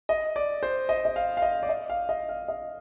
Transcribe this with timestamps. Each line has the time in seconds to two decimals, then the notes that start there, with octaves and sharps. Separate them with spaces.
0.09 D#5
0.36 D5
0.63 C5
0.89 D#5
1.05 D#5
1.16 F5
1.37 F5
1.42 D#5
1.63 D5
1.69 D#5
1.90 F5
2.09 D#5
2.29 F5
2.48 D#5